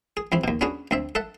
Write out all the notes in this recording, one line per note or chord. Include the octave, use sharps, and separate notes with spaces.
G#4
E2 E3 C4
D#2 B2
B3 C#4 D4 F#4 G#4
D2 C4 E5
A4 E5 F#5